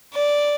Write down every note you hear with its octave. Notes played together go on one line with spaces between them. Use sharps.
D5